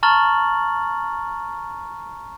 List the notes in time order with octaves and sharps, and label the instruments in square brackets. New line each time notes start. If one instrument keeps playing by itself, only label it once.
[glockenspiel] A5 A#5 C#6 F6 A6 F#7